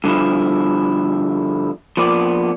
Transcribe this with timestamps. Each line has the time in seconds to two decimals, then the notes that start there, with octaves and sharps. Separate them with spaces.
0.04 G2 D3 F3 E4
1.97 F3 A#3 B3 D5